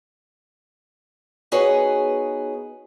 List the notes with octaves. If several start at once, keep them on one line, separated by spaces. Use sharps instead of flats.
B3 D#4 F#4 G#4 B4 C#5